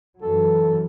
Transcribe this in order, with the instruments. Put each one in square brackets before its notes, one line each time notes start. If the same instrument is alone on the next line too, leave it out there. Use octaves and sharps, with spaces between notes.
[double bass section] F#2 E3 F#3 [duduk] A4